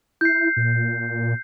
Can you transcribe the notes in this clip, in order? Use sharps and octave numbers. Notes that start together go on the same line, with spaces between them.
E4 G6 C7
A#2